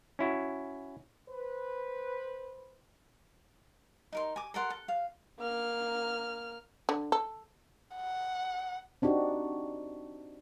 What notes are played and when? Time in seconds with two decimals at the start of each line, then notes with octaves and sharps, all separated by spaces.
0.19 C#4 E4 F#4
1.29 B4 C5
4.12 D#4 A#4 C6
4.36 G#5 D6
4.54 A4 A#4 F#5 C6
4.70 A4
4.88 F5
5.39 A#3 F6
6.89 D3
7.12 A4
7.96 F#5
9.02 C4 D4 D#4 F#4 G4